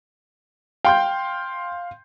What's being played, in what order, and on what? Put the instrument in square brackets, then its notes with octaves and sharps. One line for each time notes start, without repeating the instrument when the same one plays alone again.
[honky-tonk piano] F5 C6 G6 [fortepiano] G5